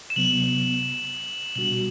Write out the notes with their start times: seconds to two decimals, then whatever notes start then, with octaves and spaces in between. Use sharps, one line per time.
0.10 E7
0.16 C3 F#3 B3 F#7
1.56 B2 G3 D4 F#4 F#7